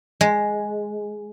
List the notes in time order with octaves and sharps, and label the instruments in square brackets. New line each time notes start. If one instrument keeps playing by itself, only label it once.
[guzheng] G#3